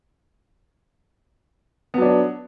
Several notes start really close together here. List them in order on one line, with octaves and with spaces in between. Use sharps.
B3 F#3 D4